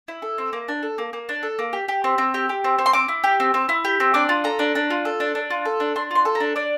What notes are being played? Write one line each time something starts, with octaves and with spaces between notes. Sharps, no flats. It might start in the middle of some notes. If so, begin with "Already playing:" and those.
E4
A4
C4
A#3
D4
A4
A#3
A#3
D4
A4
A#3
G4
G4
C4
C4
G4
G4
C4
C4
C6
C4 D6
E4
G4
C4
C4
E4
G4
C4
D4 D6
F4
A4 A#5
D4
D4
F4
A4
D4
D4
F4
A4
D4
D4 C6
F4 C6
A4
A#5
D4
D4 D5